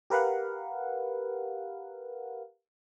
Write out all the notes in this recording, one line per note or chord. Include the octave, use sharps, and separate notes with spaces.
G4 A#4 B4 F5 F#5